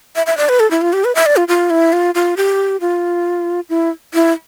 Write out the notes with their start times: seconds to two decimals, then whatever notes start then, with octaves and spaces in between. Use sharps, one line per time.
0.16 E5
0.26 E5
0.37 D5
0.49 B4
0.60 A4
0.71 E4
0.82 F4
0.93 G4
1.05 B4
1.15 E5
1.26 D5
1.36 F4
1.48 F4
1.70 E4
1.93 F4
2.15 F4
2.37 G4
2.81 F4
3.69 E4
4.14 E4